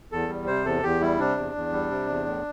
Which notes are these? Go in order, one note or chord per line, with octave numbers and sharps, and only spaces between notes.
E2 A4
G3
C3 C5
E2 A4
E2 G4
G3 E4
C3 D4
E2
E2
G3
C3
E2
A2